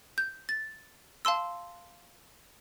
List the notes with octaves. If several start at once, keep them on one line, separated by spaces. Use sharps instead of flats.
G6
A6
F5 A5 C6 E6